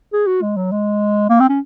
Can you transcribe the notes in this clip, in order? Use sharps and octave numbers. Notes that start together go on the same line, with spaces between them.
G#4
F#4
G#3
F#3
G#3
A#3
C4
C#4